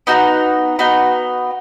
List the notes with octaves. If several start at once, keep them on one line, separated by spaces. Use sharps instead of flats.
B3 D#4 F#4
B3 D#4 F#4